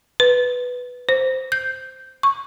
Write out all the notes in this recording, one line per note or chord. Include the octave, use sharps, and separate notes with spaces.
B4
C5
G6
C#6